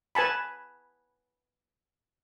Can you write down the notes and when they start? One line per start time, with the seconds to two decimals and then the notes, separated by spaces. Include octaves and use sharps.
0.15 B4 G#5 A5 B5